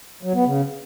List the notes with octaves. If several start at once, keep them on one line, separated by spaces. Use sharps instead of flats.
F#3
B3
C#3